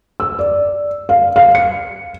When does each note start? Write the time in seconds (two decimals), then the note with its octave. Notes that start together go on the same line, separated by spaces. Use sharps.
0.20 E6
0.39 D5
1.09 F5
1.36 F5
1.55 C#7